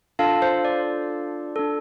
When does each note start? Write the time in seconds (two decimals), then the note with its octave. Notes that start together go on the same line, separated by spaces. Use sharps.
0.19 D4 F4 A4 F5 A5
0.42 C5 F5
0.65 D5
1.56 D4 A4